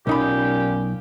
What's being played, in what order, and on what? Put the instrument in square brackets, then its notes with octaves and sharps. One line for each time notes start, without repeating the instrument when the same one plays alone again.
[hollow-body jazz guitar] B1 D#4 B5 [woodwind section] A#2 C#4 G4